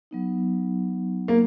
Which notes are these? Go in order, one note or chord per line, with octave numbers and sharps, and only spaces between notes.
F#3 B3 D#4
A#3